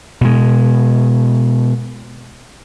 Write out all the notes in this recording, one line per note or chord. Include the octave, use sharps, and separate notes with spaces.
B2 G#3